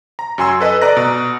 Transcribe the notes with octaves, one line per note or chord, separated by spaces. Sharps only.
A#5
F#2 F#4 G#5 C6 E6
A4 B4 D#5
D5 D#5 A#5 F#6 A#6
B2